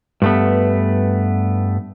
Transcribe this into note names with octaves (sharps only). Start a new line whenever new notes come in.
G2 A3 B3